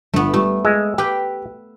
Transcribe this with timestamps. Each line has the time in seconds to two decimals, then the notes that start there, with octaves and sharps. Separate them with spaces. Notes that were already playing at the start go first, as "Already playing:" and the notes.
0.14 G1 A3 B3
0.34 G3 A3
0.65 G#3 E6
0.98 G4 B4 G5